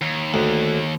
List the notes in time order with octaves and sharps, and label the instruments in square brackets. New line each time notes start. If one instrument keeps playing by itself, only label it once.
[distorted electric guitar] D#2
[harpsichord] D2